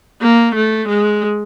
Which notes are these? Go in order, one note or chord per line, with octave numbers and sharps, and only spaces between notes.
A#3
A3
G#3